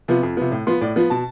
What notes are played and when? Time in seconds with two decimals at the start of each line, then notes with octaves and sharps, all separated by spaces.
0.08 C3 F3 B3
0.23 F2
0.37 C3 F3 B3
0.52 A2
0.67 F3 B3 C6
0.81 A2 D5
0.96 F3 B3
1.10 B2 A5